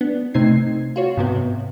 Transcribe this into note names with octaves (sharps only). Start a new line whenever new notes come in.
B3 D4
C3 A3 C4 D#4 G#6 C7
F4 F#4 C#5
G#2 C3 B3